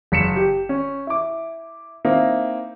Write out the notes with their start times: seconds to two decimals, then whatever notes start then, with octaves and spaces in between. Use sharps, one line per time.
0.12 F#1 B6 C#7 E7
0.36 G4
0.69 C#4
1.07 E4 D6
2.05 A#3 C4 D#4 E4